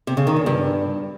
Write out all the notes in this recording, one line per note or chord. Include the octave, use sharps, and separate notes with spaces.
C3
C#3
D#3
E2
G2